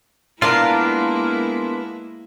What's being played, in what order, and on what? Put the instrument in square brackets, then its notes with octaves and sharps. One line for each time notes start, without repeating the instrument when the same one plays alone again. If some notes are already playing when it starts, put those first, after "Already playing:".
[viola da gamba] G#3 A#3 E4 [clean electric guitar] B3 D4 F4 [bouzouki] A#4 F5